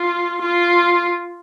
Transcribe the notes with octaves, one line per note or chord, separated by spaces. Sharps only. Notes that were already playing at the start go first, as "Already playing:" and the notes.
Already playing: F4
F4